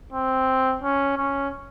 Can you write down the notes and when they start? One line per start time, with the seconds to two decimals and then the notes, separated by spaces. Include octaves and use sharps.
0.13 C4
0.82 C#4
1.17 C#4